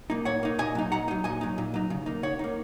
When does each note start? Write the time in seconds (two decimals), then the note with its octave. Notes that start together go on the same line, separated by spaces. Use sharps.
0.10 A#3 D#4
0.25 A#2 C#5 F#5
0.43 A#3 D#4
0.59 A#2 D#5 G#5
0.75 F#3 D#4
0.92 A#2 F#5 A#5
1.08 F#3 D#4
1.24 A#2 D#5 G#5
1.41 F#3 D#4
1.58 A#2
1.74 F#3 D#4
1.90 C#3
2.06 A#3 D#4
2.23 C#3 C#5 F#5
2.39 A#3 D#4